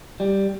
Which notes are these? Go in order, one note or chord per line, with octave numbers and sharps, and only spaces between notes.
G3